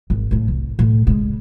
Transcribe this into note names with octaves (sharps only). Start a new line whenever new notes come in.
G#1
A2 C#3
C2
A2
C#3 G#3